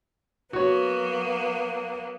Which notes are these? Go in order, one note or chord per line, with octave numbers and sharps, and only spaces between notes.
F#3 A#3 B3 F#4 C#5